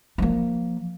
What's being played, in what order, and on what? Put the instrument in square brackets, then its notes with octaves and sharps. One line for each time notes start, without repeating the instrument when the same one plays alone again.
[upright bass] F3 A#3